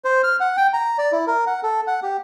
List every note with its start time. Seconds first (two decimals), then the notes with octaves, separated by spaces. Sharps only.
0.04 C5
0.23 F6
0.40 F#5
0.57 G5
0.73 A#5
0.98 D5
1.12 E4
1.27 A#4
1.47 F#5
1.63 A4
1.87 F#5
2.03 G4